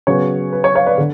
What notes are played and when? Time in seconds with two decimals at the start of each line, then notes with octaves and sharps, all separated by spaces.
0.07 C#3 F#3 B3 C#5
0.52 B4
0.64 C#5
0.75 C#5 F5
0.86 B4 D5
0.98 D3